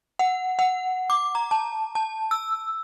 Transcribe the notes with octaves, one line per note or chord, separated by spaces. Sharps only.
F#5
F#5
D6
A#5
A5
A5
E6